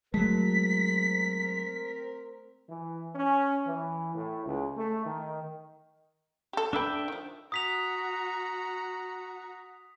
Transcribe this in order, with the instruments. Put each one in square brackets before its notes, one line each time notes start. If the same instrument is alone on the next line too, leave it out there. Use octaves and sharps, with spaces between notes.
[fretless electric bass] F#3 G#3 [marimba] A3 [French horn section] C4 A#4 [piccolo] B6
[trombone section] E3
C#4
E3
A2
C#2
A3
D#3
[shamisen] G4 A4
[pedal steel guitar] D4 E5 G5 [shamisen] A4 B4
[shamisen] D#3 F3
[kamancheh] F#4 A#5 [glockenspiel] D#6 B6 F7